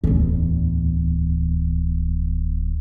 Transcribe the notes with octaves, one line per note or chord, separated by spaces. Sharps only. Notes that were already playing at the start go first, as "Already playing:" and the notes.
D1 E2